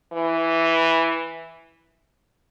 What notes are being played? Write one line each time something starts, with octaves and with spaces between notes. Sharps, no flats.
E3